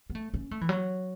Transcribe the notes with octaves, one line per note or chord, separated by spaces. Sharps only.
B3
A3
C#4
A3
E3
F#3